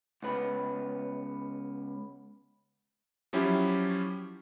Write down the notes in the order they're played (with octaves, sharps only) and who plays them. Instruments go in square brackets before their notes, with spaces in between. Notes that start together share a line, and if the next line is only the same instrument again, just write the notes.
[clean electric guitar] C#2 B3 B4
[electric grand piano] F3 F#3 C#4 E4 G4